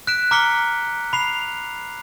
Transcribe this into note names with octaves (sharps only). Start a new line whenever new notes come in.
F#6 B6 D7 E7
A#5 D6 F6 B6 C#7 G7
B5 C7 F7